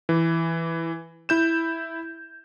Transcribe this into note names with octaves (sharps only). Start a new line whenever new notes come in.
E3
E4 G6 E7